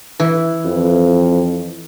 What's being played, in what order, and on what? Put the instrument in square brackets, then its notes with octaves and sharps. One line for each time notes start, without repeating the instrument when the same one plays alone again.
[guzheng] E3
[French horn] F2